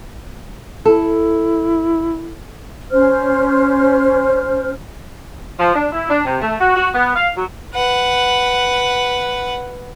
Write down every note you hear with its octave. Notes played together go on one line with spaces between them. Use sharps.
E4 A4
C#4 C5 F6
F3
D4
E4
D4
C3
A3
F#4
F#4
B3
F5
F#3
B4 F#5